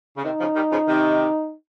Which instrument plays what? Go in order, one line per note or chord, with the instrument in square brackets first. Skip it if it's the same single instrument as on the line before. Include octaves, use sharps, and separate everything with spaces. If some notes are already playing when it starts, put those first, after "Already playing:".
[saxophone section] C#3
[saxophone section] C3 D#3 [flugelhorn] D#4
[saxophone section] C#3 F3
D#3 G3
C#3 F3
C3 D#3